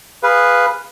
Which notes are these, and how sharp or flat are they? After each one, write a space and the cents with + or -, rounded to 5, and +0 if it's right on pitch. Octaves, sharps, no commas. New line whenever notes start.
G#4 -20 B4 +0 F5 +0